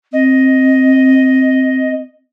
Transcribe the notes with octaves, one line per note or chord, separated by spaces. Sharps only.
C4 D#5